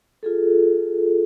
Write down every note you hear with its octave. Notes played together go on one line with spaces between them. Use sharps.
F4 G#4 A4